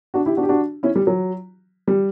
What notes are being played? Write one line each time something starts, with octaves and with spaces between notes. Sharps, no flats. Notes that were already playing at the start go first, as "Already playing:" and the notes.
D4 F#4
E4 G4
D4 F#4
G4
D4 F#4
C#4 E4
G3
F#3
G3